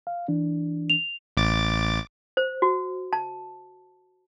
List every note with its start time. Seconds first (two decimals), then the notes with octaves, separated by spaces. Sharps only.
0.07 F5
0.28 E3 D4
0.90 F7
1.37 A1 D6 A6
2.37 C5
2.62 F#4
3.13 A5